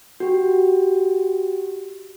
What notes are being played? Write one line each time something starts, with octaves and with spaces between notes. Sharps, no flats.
F#4 G4